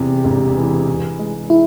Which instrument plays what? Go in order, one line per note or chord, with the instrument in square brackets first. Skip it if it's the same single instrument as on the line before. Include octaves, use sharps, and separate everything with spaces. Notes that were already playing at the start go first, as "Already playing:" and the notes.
Already playing: [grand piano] E2 C3 [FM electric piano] G4
[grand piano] E1
E3
E3
G#3
[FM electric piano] E4